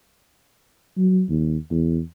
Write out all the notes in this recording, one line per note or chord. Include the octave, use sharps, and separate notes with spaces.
F#3
D#2
E2